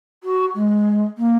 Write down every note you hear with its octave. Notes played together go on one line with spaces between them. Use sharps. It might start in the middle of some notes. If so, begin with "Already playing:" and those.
F#4
G#3
A#3